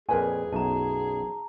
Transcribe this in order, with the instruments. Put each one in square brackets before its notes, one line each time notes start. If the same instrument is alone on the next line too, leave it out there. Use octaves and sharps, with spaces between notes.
[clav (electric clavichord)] F2 A#2 [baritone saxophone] G#4 [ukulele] A#4 B4 G#5
[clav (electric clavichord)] B1 F#2 [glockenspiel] A5 A#5